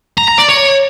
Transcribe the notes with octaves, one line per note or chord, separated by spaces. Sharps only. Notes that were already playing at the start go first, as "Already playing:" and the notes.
A#5
A#5
D5
C#5